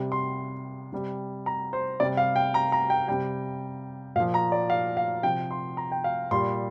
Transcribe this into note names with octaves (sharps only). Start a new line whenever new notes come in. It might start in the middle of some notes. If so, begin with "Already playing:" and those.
Already playing: C3 G3
C6
C3 G3
A#5
C5
C3 G3 D5
F5
G5
A#5
A#5
G5
C3 G3 G5
A#2 F3 F5
A#5
D5
F5
F5
C3 F3 G5
C6
A#5
G5
F5
A#2 G3 C6